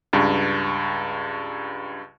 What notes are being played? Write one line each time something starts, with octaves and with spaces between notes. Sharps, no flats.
C#2 G2